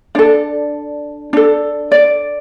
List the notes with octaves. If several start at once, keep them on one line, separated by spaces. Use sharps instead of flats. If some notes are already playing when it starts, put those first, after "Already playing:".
D4 A4 D5
D4 A4
D5